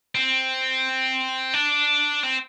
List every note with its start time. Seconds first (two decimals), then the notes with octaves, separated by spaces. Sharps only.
0.15 C4
1.54 D4
2.23 C4